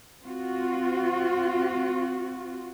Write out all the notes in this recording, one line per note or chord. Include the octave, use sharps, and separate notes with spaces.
C4 F4 F#4